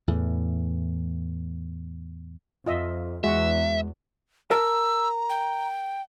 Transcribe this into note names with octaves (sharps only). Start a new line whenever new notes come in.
E2 A2 E3
F2 F4 D#5 E5
E2 G#3 F#4 E5
A#4 A5 A#5 E6
G5